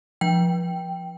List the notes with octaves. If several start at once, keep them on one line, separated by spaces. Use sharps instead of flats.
F3 G5